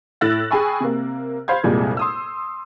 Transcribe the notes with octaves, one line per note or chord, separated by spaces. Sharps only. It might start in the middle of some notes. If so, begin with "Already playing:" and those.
A2 E4 E6 F#6 A6 A#6
G#4 G5 G#5 B5 C#6
C3 A#3
C5 F5 B5 C6 G6 G#6
C2 F2 A#2 G3 G#3
C6 D#6 E6